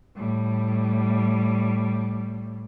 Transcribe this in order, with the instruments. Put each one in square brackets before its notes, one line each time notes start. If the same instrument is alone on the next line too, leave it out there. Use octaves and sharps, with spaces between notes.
[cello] A2 G3